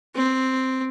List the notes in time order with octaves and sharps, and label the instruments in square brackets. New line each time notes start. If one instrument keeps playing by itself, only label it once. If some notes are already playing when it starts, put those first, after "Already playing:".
[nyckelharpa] C4